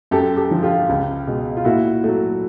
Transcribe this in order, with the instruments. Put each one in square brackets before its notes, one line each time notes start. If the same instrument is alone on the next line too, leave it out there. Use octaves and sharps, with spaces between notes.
[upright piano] F#2 G4 A4
G4 A4
D3 F3
F4 G4
C#2
B2 G#3
F4
A#2 E4 F#4
F#3 A3